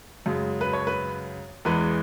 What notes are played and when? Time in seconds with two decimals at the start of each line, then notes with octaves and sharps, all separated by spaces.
0.26 F#2 C#3 G#3
0.61 B4
0.73 C#5
0.87 B4
1.65 E2 E3 G#3 B4